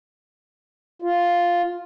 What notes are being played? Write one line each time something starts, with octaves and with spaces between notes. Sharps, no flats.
F4